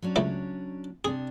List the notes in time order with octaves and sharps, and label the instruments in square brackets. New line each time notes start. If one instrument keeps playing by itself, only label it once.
[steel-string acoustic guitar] F#3 C#4 D4
[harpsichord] C#2 C#3 A3
[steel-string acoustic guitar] C3 D4 [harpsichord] G#4